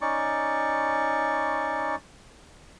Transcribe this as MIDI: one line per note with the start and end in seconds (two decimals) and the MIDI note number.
0.01 1.95 61
0.01 1.95 63
0.01 1.95 74
0.01 1.95 85